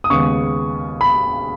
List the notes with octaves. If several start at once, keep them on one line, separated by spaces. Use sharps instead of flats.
D#6
D#2 C#3 G#3 B3 C#6
B5